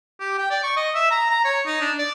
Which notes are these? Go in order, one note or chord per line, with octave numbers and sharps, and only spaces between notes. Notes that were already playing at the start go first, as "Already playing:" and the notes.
G4
G5
D5
C#6
D#5
E5
A#5
A#5
C#5
D#4
D4
D5